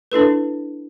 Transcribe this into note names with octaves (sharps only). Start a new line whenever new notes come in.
D4 E4 A4 B4